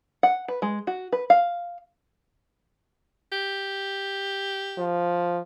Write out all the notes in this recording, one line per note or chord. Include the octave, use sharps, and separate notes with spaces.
F#5
B4
G#3
F#4
B4
F5
G4
F3